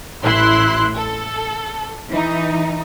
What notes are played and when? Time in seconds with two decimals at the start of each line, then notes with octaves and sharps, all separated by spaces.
0.22 A1 E4 C6 F#6
0.96 A4
2.10 E3 D#4